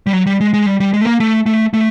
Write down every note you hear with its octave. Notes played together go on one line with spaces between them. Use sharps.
G3
F#3
G3
G#3
G#3
G3
G3
G#3
A3
A#3
A3
A3
A3